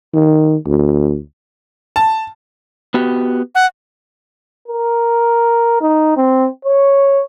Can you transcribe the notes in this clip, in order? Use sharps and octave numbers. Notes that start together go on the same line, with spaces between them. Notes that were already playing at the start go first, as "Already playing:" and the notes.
D#3
D2
A5
B3 F#4 G4
F#5
A#4
D#4
C4
C#5